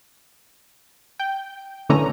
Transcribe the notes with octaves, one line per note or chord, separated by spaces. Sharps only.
G5
D3 E3 A3 C#4 A#5